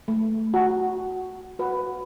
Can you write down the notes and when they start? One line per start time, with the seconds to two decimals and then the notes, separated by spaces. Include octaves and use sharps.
0.08 A3
0.54 F#4
1.59 F#4 B4